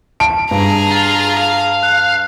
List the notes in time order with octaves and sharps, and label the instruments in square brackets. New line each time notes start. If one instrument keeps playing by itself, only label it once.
[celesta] A5 [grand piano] D7
[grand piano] G2 [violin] G#4 A#5
[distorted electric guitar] F4
F5
[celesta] F#6